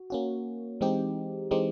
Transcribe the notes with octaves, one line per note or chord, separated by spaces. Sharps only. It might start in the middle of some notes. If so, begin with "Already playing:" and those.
Already playing: F#4
A#3 C#4 F#4
E3 G#3 C4 D#4 G4
E3 G#3 C4 D#4 G4